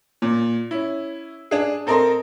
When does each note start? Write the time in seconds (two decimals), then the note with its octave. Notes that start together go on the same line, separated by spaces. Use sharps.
0.22 A#2
0.71 C#4 E4
1.51 D4 G#4
1.87 C4 A4 A#4 D#5 C6